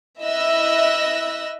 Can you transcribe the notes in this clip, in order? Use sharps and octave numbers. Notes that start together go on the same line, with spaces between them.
E4 D#5 E5 E6 F#6 A#6